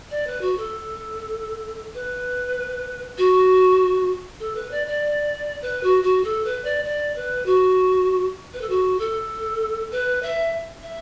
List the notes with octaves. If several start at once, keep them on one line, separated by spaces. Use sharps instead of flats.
D5
B4
F#4
A4
B4
F#4
A4
B4
D5
D5
B4
F#4
F#4
A4
B4
D5
D5
B4
F#4
B4
A4
F#4
A4
B4
E5
E5